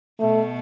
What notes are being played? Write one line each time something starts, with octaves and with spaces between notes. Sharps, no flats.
B2 A3